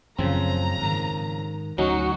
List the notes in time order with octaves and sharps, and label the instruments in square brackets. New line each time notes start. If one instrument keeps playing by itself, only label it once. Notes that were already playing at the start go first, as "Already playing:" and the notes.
[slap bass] F#2 A2 [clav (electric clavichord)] C#3 F3 C4 [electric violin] A#5
[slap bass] G#2 D#3
[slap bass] D2 [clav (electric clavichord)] F#3 C#4 D#4 [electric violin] F#4